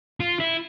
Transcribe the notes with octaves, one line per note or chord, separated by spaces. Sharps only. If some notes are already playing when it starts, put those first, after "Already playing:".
F4
E4